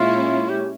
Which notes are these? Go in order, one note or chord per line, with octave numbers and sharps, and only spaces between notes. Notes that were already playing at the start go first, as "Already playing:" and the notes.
Already playing: A#2 G#3 C#4 E4 F4
G4